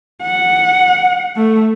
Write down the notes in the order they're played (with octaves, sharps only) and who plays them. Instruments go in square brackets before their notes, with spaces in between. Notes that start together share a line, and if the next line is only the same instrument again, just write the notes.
[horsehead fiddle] F#5
A3